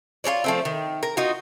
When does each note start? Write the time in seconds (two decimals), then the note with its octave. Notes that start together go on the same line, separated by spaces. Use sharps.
0.24 F4 A#4 C#5 D5
0.44 F3 A3 C4
0.65 D#3
1.03 A#4
1.17 D#4 F4 F#4